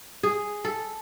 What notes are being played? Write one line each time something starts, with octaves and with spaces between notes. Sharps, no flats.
G#4
A4